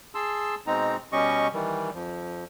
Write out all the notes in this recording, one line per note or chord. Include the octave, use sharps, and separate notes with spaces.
G#4 A5 C6 E6
B2 G#3 C4 D#4 A#5
B2 G3 C#4 G4 D#5 C#6
D#3 E3 G3
F2 F3